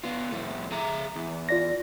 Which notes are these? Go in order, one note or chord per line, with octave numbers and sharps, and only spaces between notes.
B3 F4
F2 A2 A3
G#4 E5 A#5
E2
F4 D5 A#6